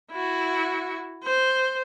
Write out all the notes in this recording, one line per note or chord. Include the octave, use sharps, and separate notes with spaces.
E4 F#4
C5